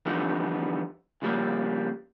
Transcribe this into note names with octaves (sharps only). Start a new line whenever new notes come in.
D3 E3 F3 G3 B3 D#4
C#3 F3 G3 A3 A#3